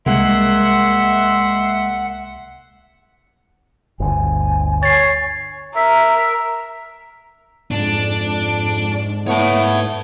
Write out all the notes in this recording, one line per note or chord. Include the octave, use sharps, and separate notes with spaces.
C2 G#3 A#3 E5 F#5 C6
G1 D2 G#5
C#5 A6 C7
A#4 E5
F2 G#2 D4
A3 B3 E4 C#5 A5